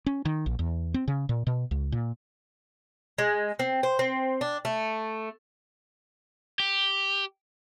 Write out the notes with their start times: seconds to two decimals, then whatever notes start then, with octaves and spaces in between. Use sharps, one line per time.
0.06 C#4
0.25 D#3
0.46 A#1
0.59 E2
0.94 C4
1.08 C#3
1.29 A#2
1.47 B2
1.71 C#2
1.92 A#2
3.18 G#3
3.59 C4
3.83 C5
3.99 C4
4.41 D4
4.65 A3
6.60 G4